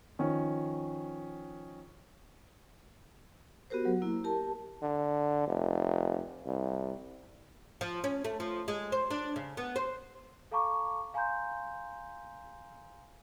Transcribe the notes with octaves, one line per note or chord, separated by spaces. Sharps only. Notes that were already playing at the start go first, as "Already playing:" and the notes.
D#3 F3 C#4
B3 F#4 G4 A#4 C5
F#3
A#3 E4
G4 A#4 A5
D3
F1
C2
F3
C#4
A3
F3
G#3
C5
D4
C#3
B3
C5
A4 F5 A5 A#5 C#6 D6
F5 G#5 A#5 C6 G6